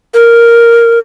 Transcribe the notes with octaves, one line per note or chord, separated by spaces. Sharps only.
A#4